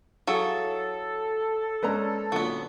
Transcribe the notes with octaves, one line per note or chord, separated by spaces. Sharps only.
F#3 E4 G#4 A4 F5
G#3 C#4 B4 D5 A#5
A#2 D3 F#3 B3